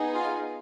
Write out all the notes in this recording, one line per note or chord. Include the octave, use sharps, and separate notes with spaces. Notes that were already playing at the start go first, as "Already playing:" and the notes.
Already playing: B3 D#4 G#4
F4 F5